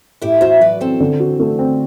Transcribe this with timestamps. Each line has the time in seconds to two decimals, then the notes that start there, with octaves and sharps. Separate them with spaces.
0.22 A2 E4 G4
0.41 F#4 C5 E5
0.60 F#3 B4 D5
0.81 C4 A4 C5
1.00 D3
1.20 F#4
1.40 A3
1.59 C4